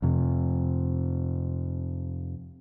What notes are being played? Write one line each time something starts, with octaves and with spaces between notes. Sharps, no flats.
F2 C3